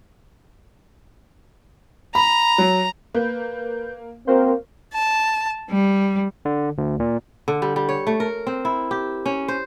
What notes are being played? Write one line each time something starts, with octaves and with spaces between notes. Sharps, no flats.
A#5 B5
F#3
A#3 B4 G6
A#3 C4 F#4 A#4 C5
A5
G3
D3
D2
A#2
D3
G3
G3
C#5
A3
A#4
C4
E4
G4
C#4
C5